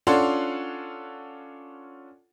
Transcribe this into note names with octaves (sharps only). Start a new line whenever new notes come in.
C#4 D4 F4 A4 F#5 C6